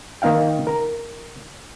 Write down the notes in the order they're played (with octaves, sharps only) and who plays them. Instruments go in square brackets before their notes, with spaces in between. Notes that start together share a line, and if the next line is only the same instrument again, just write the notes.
[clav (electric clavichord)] D#3 A#3 D#4 F5 G5
A#4 A#5